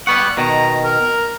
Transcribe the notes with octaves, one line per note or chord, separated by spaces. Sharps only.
G3 B3 F#5 C#6
B2 D#3 A#5
A#4